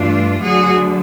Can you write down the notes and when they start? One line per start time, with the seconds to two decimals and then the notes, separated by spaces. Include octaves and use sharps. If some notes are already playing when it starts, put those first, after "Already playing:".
Already playing: G2 E3 A3 D4 F4
0.41 D2 D3 F#3 F#4 G#4